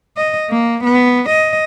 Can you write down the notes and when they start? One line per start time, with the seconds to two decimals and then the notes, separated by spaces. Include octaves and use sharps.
0.17 D#5
0.50 A#3
0.84 B3
1.29 D#5